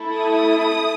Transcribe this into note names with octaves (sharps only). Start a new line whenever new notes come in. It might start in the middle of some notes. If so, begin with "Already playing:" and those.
Already playing: A3 E4 A4
D#6